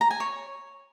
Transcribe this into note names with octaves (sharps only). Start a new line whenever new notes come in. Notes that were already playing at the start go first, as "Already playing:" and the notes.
A#5
G#5
C#5